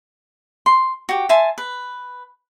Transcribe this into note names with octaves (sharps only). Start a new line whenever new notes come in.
C6
F#4 G4
E5 G#5 A5 C6
B4